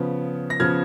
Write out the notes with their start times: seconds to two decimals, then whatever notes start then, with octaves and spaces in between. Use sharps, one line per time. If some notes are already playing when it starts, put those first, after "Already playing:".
Already playing: C#3 F3 B3
0.50 A#6
0.60 C#3 F3 B3 F6 G#6